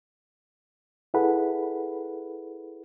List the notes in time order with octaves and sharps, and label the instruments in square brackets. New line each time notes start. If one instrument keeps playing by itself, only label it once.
[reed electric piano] E4 G#4 A4 B4 F#5 B5